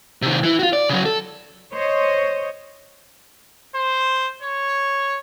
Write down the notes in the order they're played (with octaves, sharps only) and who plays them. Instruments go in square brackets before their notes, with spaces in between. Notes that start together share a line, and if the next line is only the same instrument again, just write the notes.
[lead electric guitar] C3 D#3
E3 E4
F4 F#4
D5
C#3 F#3
A4
[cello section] C5 C#5 D#5
[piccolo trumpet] C5
C#5